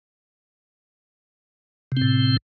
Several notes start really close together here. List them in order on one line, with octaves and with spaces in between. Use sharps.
C3 C4 A2